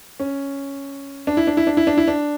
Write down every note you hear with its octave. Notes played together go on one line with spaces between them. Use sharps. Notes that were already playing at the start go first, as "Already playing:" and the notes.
C#4
D4
E4
D4
E4
D4
E4
D4
E4
D4